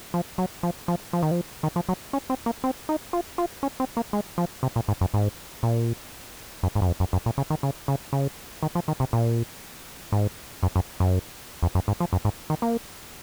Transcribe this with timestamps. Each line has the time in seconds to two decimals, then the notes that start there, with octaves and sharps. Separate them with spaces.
0.14 F3
0.38 F#3
0.63 F3
0.88 F3
1.13 F3
1.22 D#3
1.31 F3
1.63 D#3
1.76 F3
1.89 F#3
2.13 C#4
2.30 C4
2.46 A#3
2.64 C4
2.89 D#4
3.13 F4
3.38 F4
3.63 C#4
3.80 C4
3.97 A#3
4.13 G#3
4.38 F3
4.63 C3
4.76 A#2
4.88 G#2
5.01 F#2
5.14 G#2
5.63 A#2
6.63 F#2
6.75 G#2
6.82 F#2
6.87 F2
7.00 F#2
7.13 F#2
7.26 A#2
7.38 C#3
7.50 D#3
7.63 C#3
7.88 C#3
8.13 C#3
8.63 D#3
8.75 F3
8.88 D#3
9.00 C3
9.13 A#2
10.12 G#2
10.63 F#2
10.76 F#2
11.00 F#2
11.63 F2
11.75 F#2
11.88 G#2
12.00 F3
12.13 F#2
12.25 G#2
12.50 D#3
12.62 A#3